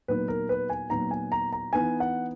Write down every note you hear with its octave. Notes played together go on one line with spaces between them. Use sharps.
A#2 F#3 B3 D#4 B4
A#4
B4
G#5
A#2 F#3 B3 D#4 A#5
G#5
A#5
A#5
E3 B3 D#4 G#5
F#5